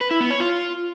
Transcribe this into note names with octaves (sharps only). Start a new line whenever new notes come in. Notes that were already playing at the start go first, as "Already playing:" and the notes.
B4
E4
B3
C#5
F4